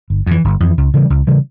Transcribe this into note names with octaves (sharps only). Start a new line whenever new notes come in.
G1
F2 E3
G1
F2 E3
C#2
C#3 E3 G3
C#2
C#3 E3 G3